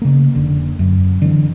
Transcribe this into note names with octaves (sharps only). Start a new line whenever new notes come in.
C#3 A#3
F1 D3
F#2
D3 E3 C4